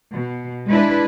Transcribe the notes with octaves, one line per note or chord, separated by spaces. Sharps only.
B2
G#3 D4 E4 B4